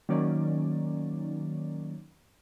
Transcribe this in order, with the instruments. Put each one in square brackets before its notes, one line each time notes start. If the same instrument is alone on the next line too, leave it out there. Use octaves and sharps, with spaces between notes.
[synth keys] D#3 F#3 A#3 C#4 D5